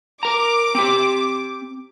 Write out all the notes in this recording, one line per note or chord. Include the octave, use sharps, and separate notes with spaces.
A#4 A#5 D6
C4 G4